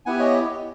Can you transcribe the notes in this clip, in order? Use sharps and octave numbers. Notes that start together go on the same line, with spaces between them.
B3 E4 G4 F#5 G#5
C#5 D#5